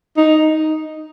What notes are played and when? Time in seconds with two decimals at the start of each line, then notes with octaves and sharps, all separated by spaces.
0.17 D#4